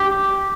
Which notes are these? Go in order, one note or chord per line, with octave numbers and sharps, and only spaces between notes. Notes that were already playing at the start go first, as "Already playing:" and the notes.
Already playing: G4